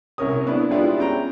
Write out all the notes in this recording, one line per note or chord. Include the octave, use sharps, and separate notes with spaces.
C2 C#4 A#4 C#5 D#6
B3 D4 E4
G3 G#3 B3 D4 E4 F4
C#4 G5 A#5